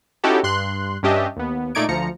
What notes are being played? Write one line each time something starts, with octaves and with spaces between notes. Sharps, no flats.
C#4 D#4 E4 F#4 G4 A4
G2 C6 F#6
G2 C#4 D4 G4 D#5 E5
D#2 B3
A#2 A3 D#4 D5 G#6 D7
D2 F3 A#5 C#7